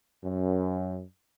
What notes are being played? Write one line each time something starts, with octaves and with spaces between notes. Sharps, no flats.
F#2